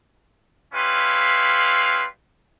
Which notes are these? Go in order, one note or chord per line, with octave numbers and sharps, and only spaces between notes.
G3 C#4 E4 B4 F5 C6